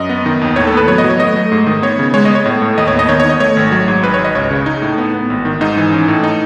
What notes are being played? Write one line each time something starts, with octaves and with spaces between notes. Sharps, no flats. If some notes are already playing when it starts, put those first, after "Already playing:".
Already playing: F#2 D#5
B3
D#3
D#2
A2 C#5
A4
B3 B4
F#3 C#5
D#5
F#3
C#5
A3 D#5
A3
G#2
D#3
B3 C#5
C#3
G#3 C#5
B3 D#5
C#5
A2
A2
D#2 D#5
C#5
B3
D#5
D#3 C#5
D#3 C#5
D#5
A3 C#5
G#1
F#3
G#2
G#1 B4
C#5
G#1
D#5
C#2 C#5
C#3
D#4
A2
B3
B3
G#1
D#3
G#2 D#4
E3
C#4
A2
D#4